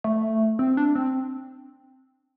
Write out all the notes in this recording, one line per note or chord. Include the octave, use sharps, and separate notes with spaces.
A3
C4
D4
C4